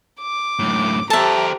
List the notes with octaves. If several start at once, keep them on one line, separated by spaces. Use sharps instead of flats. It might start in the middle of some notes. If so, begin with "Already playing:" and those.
D6
F#2 A2
G4 A4 C5 E5 A5 A#5